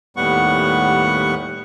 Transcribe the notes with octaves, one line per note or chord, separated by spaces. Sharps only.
D#2 A2 G3 B3 F#5 C#6